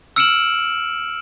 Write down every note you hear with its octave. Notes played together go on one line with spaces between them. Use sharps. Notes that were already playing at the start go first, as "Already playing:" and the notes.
E6 F6 C#7 D7 E7 F#7